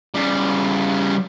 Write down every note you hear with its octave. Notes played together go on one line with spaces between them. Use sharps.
C#3 G3